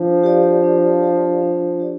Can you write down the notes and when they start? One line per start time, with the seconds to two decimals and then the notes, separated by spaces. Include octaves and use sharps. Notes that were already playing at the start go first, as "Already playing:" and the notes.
Already playing: F3 D4
0.24 G4 D5 F5
0.63 D4
1.02 G4 D5 F5
1.41 D4
1.80 G4 D5